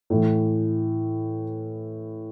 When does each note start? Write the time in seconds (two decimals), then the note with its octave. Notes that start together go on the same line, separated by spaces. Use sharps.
0.10 A2 E3